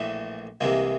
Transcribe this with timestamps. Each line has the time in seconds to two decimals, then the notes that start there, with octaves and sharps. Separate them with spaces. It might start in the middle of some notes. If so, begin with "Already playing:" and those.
Already playing: A#1 A2 E3 A3
0.61 C2 C3 E3 G#3 A#3